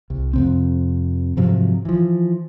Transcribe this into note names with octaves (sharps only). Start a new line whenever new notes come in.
C2
F2 C3 C4
G#2 C3 F3 F#3
E3 F3